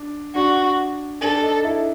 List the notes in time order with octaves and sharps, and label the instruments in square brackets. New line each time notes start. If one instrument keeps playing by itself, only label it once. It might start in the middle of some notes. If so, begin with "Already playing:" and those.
Already playing: [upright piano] D4
[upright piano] D4 [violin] F#4
[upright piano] D4 [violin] A4
[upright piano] D#4
E4